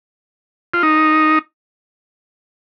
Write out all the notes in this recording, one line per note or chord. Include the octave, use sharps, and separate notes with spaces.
F4
D#4